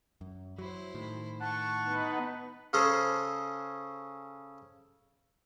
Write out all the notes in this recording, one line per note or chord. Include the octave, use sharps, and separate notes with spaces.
F#2
F#3 E4 C5
A2 D#3
A3 F#5 A5 C#6
B3 D#4 B4
C#3 C#4 G#4 A4 C5 A#5